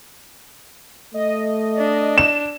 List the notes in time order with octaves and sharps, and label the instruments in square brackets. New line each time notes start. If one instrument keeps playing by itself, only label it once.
[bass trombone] A3 [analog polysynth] D#5
[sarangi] D4
[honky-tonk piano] E7